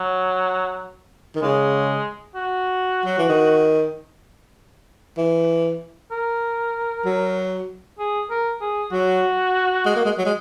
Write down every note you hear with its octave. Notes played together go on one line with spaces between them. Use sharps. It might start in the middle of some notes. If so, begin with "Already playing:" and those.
Already playing: F#3
D#3
C#3 G#3
F#4
F#3
E3
D#3
E3
A#4
F#3
G#4
A#4
G#4
F#3 F#4
G#3
A#3
G#3
F#3
G#3